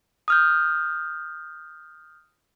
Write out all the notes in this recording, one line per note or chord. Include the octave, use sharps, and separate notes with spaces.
D#6 F6 G6